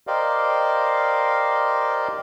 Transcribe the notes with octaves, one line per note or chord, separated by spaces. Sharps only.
G4 A#4 C5 D5 D#5 F5